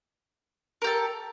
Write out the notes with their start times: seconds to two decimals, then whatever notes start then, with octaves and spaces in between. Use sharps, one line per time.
0.82 A#4
0.84 G4
0.87 A4